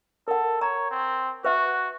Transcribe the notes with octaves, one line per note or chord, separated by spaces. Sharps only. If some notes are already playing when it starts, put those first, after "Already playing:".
A4 A#4 F#5
C#5 A#5
C4
F#4 B4 E5